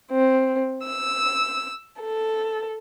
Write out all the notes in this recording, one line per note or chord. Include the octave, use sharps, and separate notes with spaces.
C4
E6
A4